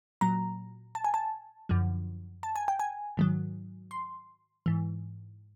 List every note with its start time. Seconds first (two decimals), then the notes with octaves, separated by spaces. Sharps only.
0.21 A#2 F#3 A#5
0.95 A5
1.04 G#5
1.14 A5
1.69 F#2 D3 F3
2.43 A5
2.56 G#5
2.68 G5
2.80 G#5
3.17 G#2 D#3 F#3
3.91 C6
4.66 G#2 E3